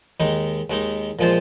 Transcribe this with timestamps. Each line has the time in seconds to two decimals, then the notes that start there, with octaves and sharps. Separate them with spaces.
0.20 D#2 D#3 G#3 D#4
0.70 D#2 D#3 G#3 D#4
1.19 A#2 F3 G#3 F4 C5